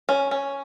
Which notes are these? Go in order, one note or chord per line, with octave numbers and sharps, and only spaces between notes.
C#4
C#4